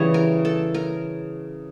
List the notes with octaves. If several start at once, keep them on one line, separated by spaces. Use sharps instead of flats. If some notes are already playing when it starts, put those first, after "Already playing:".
Already playing: C#3 E3 G3 C#5
A#4
A4
A#4